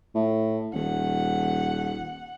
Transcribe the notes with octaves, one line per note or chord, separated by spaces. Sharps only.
A2
D#1 F#5